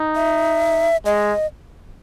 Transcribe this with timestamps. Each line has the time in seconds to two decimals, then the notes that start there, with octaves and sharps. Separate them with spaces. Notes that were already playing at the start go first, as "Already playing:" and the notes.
Already playing: D#4
0.15 E5
1.05 G#3 D#5